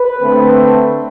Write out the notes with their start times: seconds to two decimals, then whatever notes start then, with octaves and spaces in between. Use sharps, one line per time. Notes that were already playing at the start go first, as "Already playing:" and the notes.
Already playing: B4
0.22 D3 A3 C4